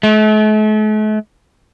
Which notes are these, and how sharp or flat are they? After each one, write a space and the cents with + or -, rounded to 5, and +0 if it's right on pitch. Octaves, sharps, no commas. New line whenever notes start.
A3 -45